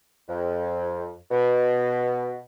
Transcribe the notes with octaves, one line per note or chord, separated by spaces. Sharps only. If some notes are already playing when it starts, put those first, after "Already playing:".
F2
B2